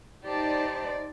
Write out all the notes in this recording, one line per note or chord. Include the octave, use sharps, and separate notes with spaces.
D#4 G4 C5 D5 A5